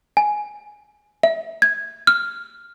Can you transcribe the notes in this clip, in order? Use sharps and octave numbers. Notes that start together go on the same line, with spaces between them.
G#5
E5
G#6
F6